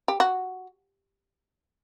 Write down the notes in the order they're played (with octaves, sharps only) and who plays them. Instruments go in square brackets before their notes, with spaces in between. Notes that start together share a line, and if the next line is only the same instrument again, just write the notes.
[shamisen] G4
F#4